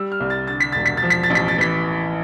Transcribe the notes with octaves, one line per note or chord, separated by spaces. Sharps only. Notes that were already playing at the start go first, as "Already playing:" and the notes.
Already playing: G3 E6
F6
C2
A6
D3 A6
B6
E1 A6
B6
A6
F3
B6
A6
A1
B6
A6
E3 B6